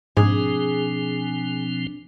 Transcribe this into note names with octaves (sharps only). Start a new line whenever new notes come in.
G#2 B2 F3 C4 D4 G#4